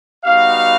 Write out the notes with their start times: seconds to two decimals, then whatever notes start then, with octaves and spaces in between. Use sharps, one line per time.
0.24 G3 B3 D#4 F#4 F5